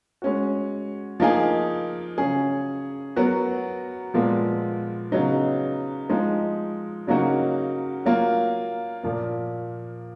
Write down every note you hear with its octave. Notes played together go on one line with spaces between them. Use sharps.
G#3 C#4 F#4
F3 A#3 D#4 G#4
C#3 F#3 C#4 G#4
F#3 B3 F#4 A#4
A#2 F3 G#3 B3
C#3 F#3 B3 D#4
F3 G#3 D#4
C#3 F#3 A#3 D#4 F#4
F#3 A#3 F4
A#2 F3 A#3